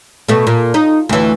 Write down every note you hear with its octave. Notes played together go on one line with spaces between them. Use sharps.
B2 A3
A#2
D#4
D2 E3